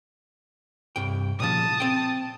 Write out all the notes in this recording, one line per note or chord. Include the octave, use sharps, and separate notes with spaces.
C2 G2 G5
A#2 C#3 F3 A5 D#6
C4 G5